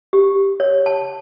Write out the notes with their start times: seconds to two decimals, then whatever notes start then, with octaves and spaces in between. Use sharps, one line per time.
0.13 G4
0.60 C#5
0.86 A5